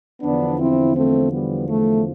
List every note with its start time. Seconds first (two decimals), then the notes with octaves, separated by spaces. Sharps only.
0.22 E2 D3 F3 B3 D4
0.59 C4 E4
0.94 A3 C4
1.31 G3 B3
1.68 A3